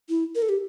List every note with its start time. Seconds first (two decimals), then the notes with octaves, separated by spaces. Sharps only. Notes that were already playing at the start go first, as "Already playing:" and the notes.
0.09 E4
0.35 A#4
0.42 A4
0.49 G4